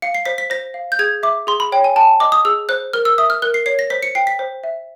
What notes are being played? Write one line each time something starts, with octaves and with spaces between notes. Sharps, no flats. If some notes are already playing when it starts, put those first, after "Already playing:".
F5 C#7
C7
C5 B6
B6
C5 A#6
F5
G6
G#4 G#6
E5 D6
G#4 C6
B5
C#5 G5
G#5
G5 A5
D#5 D6
D#6
G#4 E6
C5 F#6
A#4 F6
E6
E5 D#6
F6
A#4 F#6
C7
C#5 C7
A#6
C5 B6
C#7
G5 C7
B6
C5
E5